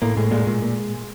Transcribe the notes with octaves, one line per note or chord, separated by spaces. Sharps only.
A2 A#3
A2 G#3
A#2 G#3
A#2
A#2